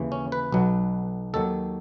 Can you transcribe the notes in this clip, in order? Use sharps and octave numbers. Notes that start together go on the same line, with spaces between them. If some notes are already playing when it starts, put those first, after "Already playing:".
Already playing: D#2 C#3 E3
C#4
B4
B1 B2 F#3
D#2 D#3 F#3 A4